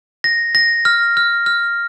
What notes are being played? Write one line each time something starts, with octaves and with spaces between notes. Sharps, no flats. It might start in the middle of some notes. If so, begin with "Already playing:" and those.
A#6
A#6
F6
F6
F6